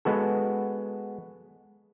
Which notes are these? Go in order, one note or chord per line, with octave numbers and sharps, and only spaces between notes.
G#3 B3 F#4 A4